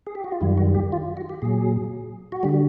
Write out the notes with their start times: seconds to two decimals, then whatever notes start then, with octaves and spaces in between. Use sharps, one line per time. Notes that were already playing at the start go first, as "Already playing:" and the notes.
0.07 G#4
0.15 G4
0.24 F#4
0.32 F4
0.41 F#2 D#3 G3 E4
0.58 F#4
0.75 G4
0.92 F4
1.17 F#4
1.29 G4
1.42 A#2 F#3 G#4
2.32 F#4
2.43 D3 G3 G4